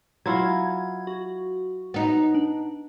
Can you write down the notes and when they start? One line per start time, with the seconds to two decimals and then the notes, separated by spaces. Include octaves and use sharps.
0.26 F#3 E4 F4 G#6
1.07 F#4
1.94 B3 D#4
2.35 D4